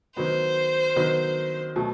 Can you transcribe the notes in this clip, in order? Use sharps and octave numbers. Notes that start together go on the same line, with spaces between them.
D#3 F#3 B3 C5
D#3 F#3 B3
B2 F#3 A3